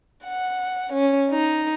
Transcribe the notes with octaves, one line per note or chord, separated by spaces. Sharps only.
F#5
C#4
D#4